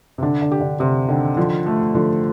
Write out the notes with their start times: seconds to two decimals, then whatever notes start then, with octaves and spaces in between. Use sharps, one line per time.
0.18 C3
0.23 D3 D4
0.42 D3
0.52 G4
0.61 D3
0.79 C3 G4
1.09 D3 D#3
1.37 D3 F3
1.66 A3
1.94 D3 F3